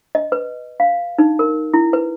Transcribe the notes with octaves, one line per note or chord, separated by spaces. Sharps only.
D#5
B4
F5
D#4
A#4
E4
B4